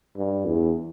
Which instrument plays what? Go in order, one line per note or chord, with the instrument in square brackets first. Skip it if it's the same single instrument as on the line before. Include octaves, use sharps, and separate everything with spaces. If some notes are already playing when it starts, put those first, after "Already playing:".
[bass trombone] G2
E2